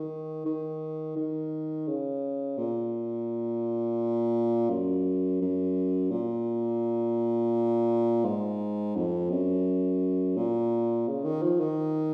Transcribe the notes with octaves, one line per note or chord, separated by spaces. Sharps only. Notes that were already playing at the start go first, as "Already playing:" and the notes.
Already playing: D#3
D#3
D#3
C#3
A#2
F#2
F#2
A#2
G#2
F2
F#2
A#2
C#3
D#3
F3
D#3